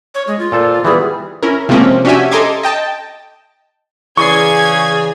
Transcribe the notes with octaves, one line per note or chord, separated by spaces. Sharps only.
C#5
G#3
F4
A#2 A4 C5
E3 G3 B3 G#4
C#4 E4 A#4
C3 F3 G#3 A#3 C4 C#4
C#4 D4 F#4 G4 E5 G#5
A4 D#5 A#5 C6 D6 G#6
D#5 G5 A5
C#3 E3 G#4 D5 C#6 G#6 C7